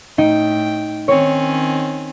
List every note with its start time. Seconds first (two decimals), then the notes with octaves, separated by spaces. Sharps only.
0.18 A2 D#4 G5
1.08 D#3 C4 C#4 C#5